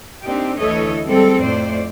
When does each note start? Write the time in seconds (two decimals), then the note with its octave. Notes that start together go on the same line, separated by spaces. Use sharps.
0.23 A#3 C4 D4 D#4 G4
0.59 D2 E3 E4 A4 C#5 D#5
1.06 G3 G#3 C4 A4
1.40 F2 A2 A3 C5 D5